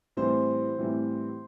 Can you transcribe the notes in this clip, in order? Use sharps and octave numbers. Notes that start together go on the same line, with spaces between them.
A2 E3 G3 C4 C5
A2 E3 G3 C4